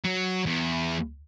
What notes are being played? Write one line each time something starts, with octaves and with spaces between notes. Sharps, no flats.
F#3
E2